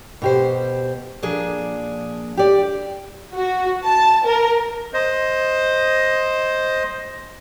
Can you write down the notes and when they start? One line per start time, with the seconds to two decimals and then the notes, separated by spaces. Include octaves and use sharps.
0.22 B2 G4 C5
1.23 A#2 F3 D4 G#4
2.37 G4 D5
3.34 F#4
3.84 A5
4.25 A#4
4.93 C5 D#5